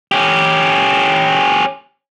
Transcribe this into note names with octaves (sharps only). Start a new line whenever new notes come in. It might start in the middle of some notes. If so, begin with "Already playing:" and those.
C#4 G4